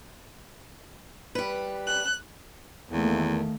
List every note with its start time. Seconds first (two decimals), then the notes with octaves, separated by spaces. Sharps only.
1.35 G3 B4
1.86 F#6
2.91 E2 D#3 A3 A#3